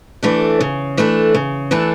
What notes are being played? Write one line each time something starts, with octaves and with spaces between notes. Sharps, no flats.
E3 A3 D4 A4
C#3
E3 A3 D4 A4
C#3
E3 A3 D4 A4